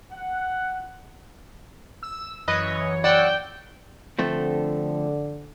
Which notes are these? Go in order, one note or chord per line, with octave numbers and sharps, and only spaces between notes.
F#5
E6
F#2 E3 B4 C#5 D#5
D5 F#5 G5 E6 F#6
D3 F3 A3 C4